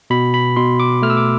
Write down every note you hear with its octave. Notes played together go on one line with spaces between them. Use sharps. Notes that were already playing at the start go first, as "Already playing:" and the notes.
B2 B5
B5
B2 C6
D6
A3 F6
E6
D6